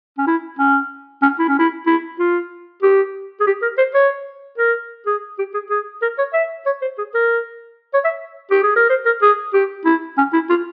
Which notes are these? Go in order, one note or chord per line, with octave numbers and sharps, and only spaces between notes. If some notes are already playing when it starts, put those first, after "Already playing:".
C#4
E4
C#4
C#4
E4
C#4
E4
E4
F4
G4
G#4
G4
A#4
C5
C#5
A#4
G#4
G4
G#4
G#4
A#4
C#5
E5
C#5
C5
G#4
A#4
C#5
E5
G4
G#4
A#4
C5
A#4
G#4
G4
E4
C#4
E4
F4